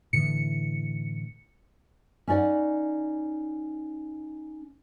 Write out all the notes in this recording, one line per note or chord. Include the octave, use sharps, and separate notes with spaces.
A2 D3 E3 C#7
C#4 D#4 D5 F#5